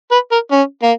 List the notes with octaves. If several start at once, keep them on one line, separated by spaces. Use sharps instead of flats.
B4
A#4
C#4
A#3